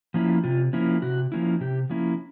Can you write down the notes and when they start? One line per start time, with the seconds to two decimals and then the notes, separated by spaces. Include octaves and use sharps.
0.14 F3 A#3 C#4 E4
0.44 C3 F4
0.73 F3 A#3 C#4 E4
1.02 C3 F#4
1.32 F3 A#3 C#4 E4
1.61 C3 G4
1.90 F3 A#3 C#4 E4